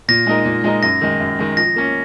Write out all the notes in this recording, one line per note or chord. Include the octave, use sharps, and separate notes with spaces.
A#2 A#6
G#3 D#4 A#4
A#2
G#3 D#4 A#4
F#2 A#6
D#3 G#3
F#2
D#3 G#3
F3 A#6
A#3 C#4